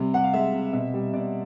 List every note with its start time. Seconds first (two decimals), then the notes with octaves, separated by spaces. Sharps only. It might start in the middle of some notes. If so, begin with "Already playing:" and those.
Already playing: C3 G3
0.14 C3 F#5
0.24 F5
0.33 G#3 E5
0.54 C3
0.73 B2 E5
0.94 G3
1.13 B2 D5